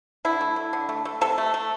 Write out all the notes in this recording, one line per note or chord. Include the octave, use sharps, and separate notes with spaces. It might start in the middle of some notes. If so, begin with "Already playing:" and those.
D3 E4
A3
A3
D3
A3
A3
C3 A4
A3
A3